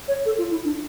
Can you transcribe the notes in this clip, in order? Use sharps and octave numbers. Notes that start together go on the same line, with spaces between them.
C#5
A4
F4
E4
D4